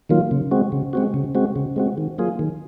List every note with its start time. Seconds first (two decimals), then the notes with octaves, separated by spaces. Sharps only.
0.09 D#3 F#3 A#3 F4
0.31 C#3
0.51 G#3 C4 F#4
0.72 C#3
0.93 G#3 C4 F#4
1.14 C#3
1.35 G#3 C4 F#4
1.56 C#3
1.76 G#3 C4 F#4
1.98 D#3
2.18 F#3 A#3 F4 G#4
2.39 D#3